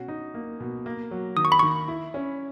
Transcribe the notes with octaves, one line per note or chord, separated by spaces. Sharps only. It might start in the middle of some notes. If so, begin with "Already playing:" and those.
Already playing: B2 C#4 F#4
D#4
A#3
B2
A#3
F#3
D#3 D#6
C#6
B5
D#3 C#6
E4
C#4